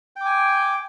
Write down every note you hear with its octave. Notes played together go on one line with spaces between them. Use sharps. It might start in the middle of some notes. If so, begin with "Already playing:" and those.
G5 G#5 D6